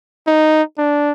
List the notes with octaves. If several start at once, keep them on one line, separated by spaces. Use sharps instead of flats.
D#4
D4